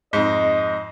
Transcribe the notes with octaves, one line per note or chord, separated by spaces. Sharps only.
F2 G#2 D#5